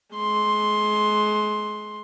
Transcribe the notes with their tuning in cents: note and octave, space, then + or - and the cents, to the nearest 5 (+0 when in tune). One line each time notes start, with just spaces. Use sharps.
G#3 +30 C6 +10